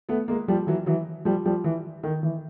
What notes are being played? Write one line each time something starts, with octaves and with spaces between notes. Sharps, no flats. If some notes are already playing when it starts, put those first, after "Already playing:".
A3 B3
G#3 A#3
F3 G3
E3 F#3
E3 F#3
F3 G3
F3 G3
E3
D#3
E3